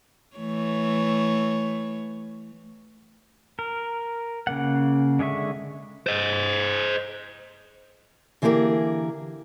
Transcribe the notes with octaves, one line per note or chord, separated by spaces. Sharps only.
E3 A3 C#5
A#4
C#3 A#3 F#5
D3 G#3 G#4 E5 C#6
C5 D#5
D3 E3 A#3 G4 G#4 A#4